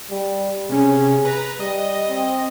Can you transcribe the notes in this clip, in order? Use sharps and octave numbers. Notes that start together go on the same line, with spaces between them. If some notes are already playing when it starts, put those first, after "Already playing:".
G3
C3 C#4 G#4
B4 A#5
G3 D#5
C4